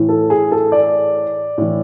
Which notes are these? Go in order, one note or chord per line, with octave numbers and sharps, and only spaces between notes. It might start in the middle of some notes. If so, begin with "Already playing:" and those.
Already playing: A2 E3
A4
G#4
A4
D5
A2 E3